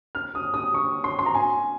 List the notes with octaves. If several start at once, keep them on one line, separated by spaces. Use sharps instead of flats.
F6
D#6
D#6
C#6
C6
C6
A#5
G#5